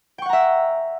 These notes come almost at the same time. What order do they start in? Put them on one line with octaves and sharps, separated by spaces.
G5 C#6 F#5 A#5 E5